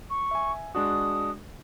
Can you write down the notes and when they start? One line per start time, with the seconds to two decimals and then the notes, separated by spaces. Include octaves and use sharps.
0.10 C#6
0.31 E5 G#5
0.75 G#3 D4 F#4 D#6